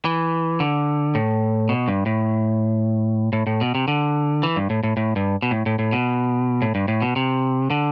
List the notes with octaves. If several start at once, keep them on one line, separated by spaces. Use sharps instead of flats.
E3
D3
A2
B2
G2
A2
A2
A2
B2
C3
D3
E3
G2
A2
A2
A2
G2
B2
A2
A2
A2
B2
A2
G2
A2
B2
C3
D3